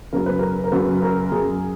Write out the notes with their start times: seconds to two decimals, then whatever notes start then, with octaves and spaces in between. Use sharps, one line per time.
0.13 F#2 C#3 A#4
0.26 B4
0.39 A#4
0.64 A#4
0.72 F#2 C#3 B4
1.02 A#4
1.32 F#2 C#3 G#4